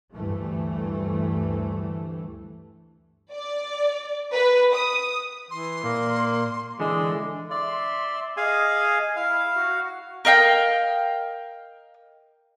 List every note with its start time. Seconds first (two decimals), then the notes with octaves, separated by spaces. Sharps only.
0.14 D2 G2 E3 A3
3.32 D5
4.32 B4
4.75 D#6
5.51 E3 C6
5.83 A#2 A#3
6.80 D3 E3 G#3
7.50 D5 E5 C6
8.37 G#4 D#5 F5 G#5
9.16 E4 F5
9.56 F#4
10.25 A#4 D#5 F5 G5